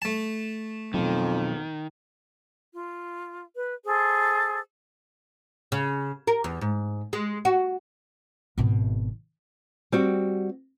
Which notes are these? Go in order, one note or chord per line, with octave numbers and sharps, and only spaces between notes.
A3 A5
F2 B2 D#3 F#3
F4
B4
G#4 A4 C5
C#3
A#4
E2
G#2
G#3
F#4
G#1 B2
G3 C4 F#4